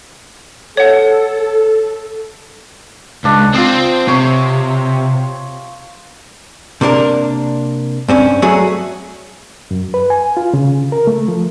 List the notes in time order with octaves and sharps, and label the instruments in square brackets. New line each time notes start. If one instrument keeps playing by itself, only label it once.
[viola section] A4 [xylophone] C#5 F#5
[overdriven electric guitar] C#2 [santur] D4
[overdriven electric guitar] C4 [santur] F4 D#6
[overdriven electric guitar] C3 [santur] C#5
[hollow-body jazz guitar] C3 A#3 D4 A#4
G2 C4 C#4
F#3 A3 F#4 G#4
[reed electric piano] F#2
B4
G#5
F4
C#3
A#4
A3
F3